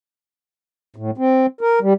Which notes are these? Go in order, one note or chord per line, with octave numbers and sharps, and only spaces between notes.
A2
C4
A#4
G3